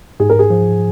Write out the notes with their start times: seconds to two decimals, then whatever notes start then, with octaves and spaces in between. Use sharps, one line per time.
0.20 G#2 G#4
0.29 A#4
0.39 G#4
0.50 F3